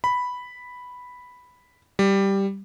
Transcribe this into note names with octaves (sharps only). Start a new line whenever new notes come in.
B5
G3